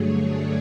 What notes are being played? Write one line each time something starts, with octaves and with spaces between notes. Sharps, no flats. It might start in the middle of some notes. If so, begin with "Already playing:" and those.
Already playing: G2 D3 F#3 A3 G#4 C#5
D5